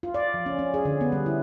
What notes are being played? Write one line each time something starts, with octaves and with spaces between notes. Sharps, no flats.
F4
D5
F3
C#4
C#4
G#4
D3
B3
G3
E4